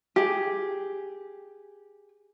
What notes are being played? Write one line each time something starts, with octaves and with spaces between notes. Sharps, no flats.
G4 G#4